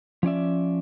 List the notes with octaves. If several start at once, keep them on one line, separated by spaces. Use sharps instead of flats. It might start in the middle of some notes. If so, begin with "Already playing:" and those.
F3 C#4 D5 E5